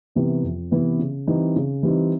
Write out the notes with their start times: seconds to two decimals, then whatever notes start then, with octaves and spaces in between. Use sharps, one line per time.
0.15 C3 E3 G3 B3
0.43 F2
0.71 C3 E3 G3 B3
0.99 C#3
1.27 E3 G3 C4 D#4
1.56 C#3
1.83 E3 G3 C4 D#4